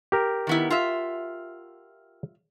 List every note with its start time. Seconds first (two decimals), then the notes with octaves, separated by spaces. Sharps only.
0.12 G4 A#4
0.47 D#3 B3 E4
0.70 F4 E5